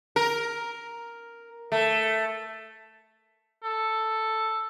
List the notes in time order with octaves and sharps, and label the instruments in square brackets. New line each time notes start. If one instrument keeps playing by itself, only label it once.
[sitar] A#4
A3
[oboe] A4